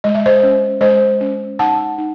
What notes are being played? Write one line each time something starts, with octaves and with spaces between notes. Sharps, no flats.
G#3 D#5
E5
C5 D#5
C#4
G#3 C5 D#5
C#4
D#4 F#5 A5
D#4